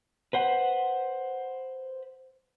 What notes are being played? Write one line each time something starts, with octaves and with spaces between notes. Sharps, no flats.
B4 C5 F#5